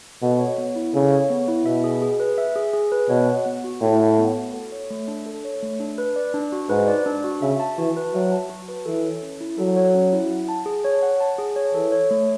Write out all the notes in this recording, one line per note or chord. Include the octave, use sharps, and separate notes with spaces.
B2 A4
C#5
B3
E4
C#3 A4
C#5
B3
E4
B2 E5
G#4
G#4
B4
E5
G#4
G#4
B4
B2 C#5
F#5
B3
F#4
A2 C#5
F#5
B3
F#4
A4
C#5
A3
D4
A4
C#5
A3
D4
B4
D5
D4
F#4
G#2 B4
D5
D4
F#4
C#3 E5
A5
E3 F#4
B4
F#3 E5
A5
F#4
B4
E3 A4
C#5
C#4
E4
F#3 A4
C#5
C#4
E4
F#5
A5
G#4
C#5
F#5
A5
G#4
C#5
E3 A4
C#5
A3